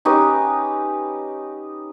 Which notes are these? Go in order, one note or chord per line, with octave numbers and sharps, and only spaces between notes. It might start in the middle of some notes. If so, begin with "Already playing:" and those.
C#4 D#4 G4 B4